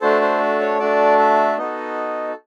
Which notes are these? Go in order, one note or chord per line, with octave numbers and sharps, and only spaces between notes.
A3 D4 F#4 A4 C5
C5
C#5
A3 D4 F#4 A4 D5
E5
B3 D#4 F#4 A4 D#5